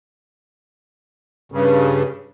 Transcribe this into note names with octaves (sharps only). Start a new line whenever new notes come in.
G2 C#3